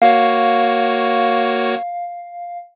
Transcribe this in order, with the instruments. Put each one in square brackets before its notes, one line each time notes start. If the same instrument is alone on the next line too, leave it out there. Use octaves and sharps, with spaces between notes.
[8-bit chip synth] A#3 F#4 C#5 [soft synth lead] F5